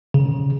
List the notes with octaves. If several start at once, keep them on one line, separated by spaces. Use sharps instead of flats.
C#3